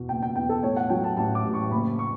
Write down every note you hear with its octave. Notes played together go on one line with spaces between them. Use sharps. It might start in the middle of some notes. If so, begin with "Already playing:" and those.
Already playing: E2 B2
F#1 G5
G5
E2 G5
A4
A2 C#5
F#5
F#3 G5
A5
A1 A5
D6
A1
C#6
F#1 B5
C#6